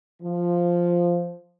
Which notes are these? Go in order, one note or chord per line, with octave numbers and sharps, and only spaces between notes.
F3